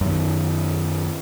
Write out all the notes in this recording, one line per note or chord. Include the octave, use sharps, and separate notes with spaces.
F#2 D#3